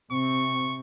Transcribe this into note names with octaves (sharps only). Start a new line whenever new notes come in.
C3 C4 C#6